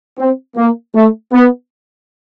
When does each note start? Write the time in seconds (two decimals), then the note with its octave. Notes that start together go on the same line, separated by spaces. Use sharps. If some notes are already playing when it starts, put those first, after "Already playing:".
0.18 C4
0.56 A#3
0.94 A3
1.33 B3